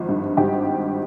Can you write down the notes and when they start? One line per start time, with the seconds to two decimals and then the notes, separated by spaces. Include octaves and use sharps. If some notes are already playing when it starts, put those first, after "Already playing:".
Already playing: G#1 F3
0.09 G2
0.37 G#1 G4